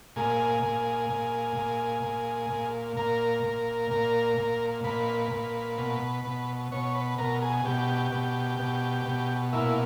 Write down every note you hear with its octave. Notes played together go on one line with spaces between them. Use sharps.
A#2 G#4
A#2
A#2
A#2
A#2
A#2
A#2 A#4
A#2
A#2
A#2
A#2 B4
A#2
B2
B2
B2 C#5
B4
B2 A#4
G#4
B2 G4
B2
B2
B2
A#2 E4